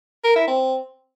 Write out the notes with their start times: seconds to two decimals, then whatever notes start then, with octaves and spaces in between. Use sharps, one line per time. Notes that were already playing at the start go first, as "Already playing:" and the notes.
0.24 A#4
0.36 E4
0.47 C4